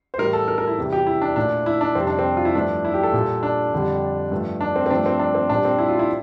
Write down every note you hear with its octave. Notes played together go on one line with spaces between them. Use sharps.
C5
A2 E3 G3 A#4
A4
A#4
A#4
E4
E2 C3 G3
G4
E4
D4
A#2 A3 D4
E4
D4
F2 C3 G3 C4
D4
C4
F4
E4
G2 F3 A3 D4
E4
G4
A4
A#2 G3
D4
F2 D3 G3
G2 F3 A3
D4
C4
C4
G2 F3 A3 D4
C4
D4
C4
A#2 G3 D4
C4
E4
F4
E4